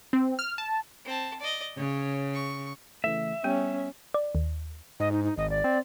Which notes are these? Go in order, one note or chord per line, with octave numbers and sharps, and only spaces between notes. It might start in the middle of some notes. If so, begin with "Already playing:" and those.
C4
F6
A5
C4 A5
D5 D#5
C#3 C#5
C#6
C#3 E3 A3 E5
G3 B3 C#4
D5
D#2
G#2 D#5
D#4
D#4
G#1 D#5
D5
C4